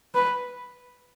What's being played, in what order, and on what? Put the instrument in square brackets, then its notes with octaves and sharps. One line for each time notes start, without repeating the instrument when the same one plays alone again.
[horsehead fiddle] B4